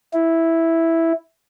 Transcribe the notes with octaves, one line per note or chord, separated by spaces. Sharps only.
E4